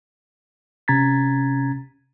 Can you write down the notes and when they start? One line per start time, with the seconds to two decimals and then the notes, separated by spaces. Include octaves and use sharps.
0.88 C3 C#4 A#5 G#6 A6 B6